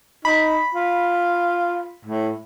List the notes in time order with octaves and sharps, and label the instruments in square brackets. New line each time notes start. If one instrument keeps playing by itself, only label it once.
[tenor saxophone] D#4 [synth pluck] B5
[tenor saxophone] F4
A2